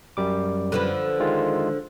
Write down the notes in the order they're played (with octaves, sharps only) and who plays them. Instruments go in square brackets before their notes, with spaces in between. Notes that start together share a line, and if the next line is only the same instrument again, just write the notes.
[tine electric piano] F#2 G3 D6
[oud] D3 F3 B4
[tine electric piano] D#3 G#3 F4